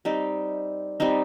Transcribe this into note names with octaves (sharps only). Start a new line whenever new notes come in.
G3 C4 D#4
G3 C4 D#4